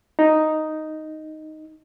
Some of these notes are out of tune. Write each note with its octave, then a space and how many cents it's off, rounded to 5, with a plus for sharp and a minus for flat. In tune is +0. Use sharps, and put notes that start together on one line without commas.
D#4 +0